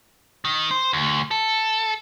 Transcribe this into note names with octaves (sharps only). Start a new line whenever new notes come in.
D#3
C5
D2
A4